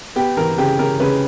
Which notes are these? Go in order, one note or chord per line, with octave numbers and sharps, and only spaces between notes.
B3 G4
E3 A#4
C#3 G4
C#3 A#4
C#3 B4